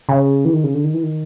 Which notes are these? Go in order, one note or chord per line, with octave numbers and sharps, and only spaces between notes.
C#3
E3
D#3
C#3
D3
D#3
E3
D#3